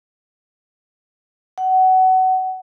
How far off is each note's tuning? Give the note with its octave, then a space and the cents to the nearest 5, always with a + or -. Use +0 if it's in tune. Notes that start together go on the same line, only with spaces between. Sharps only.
F#5 +25